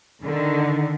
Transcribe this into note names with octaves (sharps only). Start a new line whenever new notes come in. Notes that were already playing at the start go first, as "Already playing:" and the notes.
D3 D#3